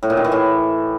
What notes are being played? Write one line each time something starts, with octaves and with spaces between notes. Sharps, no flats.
A2
A#2
D#3
E3
A2